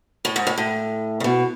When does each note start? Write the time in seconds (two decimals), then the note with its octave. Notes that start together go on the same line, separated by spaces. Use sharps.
0.25 A2
0.36 G#2
0.47 A2
0.58 A2
1.20 C#3
1.24 B2